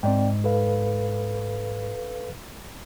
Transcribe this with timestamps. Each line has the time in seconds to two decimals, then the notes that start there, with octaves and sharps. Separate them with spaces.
0.03 G#2 C4 D5 G5
0.44 A4 B4 F5